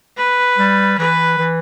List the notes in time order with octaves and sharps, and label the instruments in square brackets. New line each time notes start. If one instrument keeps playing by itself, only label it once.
[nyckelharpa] B4
[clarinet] G3
[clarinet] E3 [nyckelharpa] B4
[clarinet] E3